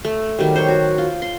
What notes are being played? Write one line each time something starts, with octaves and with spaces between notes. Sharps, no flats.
A3
D#3 F#3 G3
C5 C#5
F#4
F4
C6